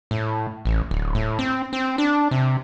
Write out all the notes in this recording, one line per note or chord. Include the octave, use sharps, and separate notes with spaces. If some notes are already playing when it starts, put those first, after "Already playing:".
A2
A1
D1
A2
C4
C4
D4
C3